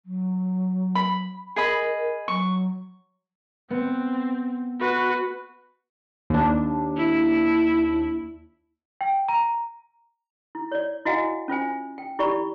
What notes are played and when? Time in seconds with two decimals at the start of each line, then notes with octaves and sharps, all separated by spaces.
0.05 F#3
0.95 B5
1.56 G#4 A#4 D#5 B5
2.28 F#3 C#6
3.70 B3 C4
4.80 F#4 B4
6.30 D#2 D4
6.98 E4
9.01 G5
9.28 A#5
10.55 E4
10.72 C#5 D5
11.06 E4 F#4 D#5 F5 F#5 G#5
11.48 C#4 F4 C5 G#5
11.98 G5
12.19 E4 G4 D5 B5 C#6